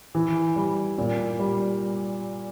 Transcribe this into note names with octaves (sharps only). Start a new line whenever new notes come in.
E3
G3
A#2
G3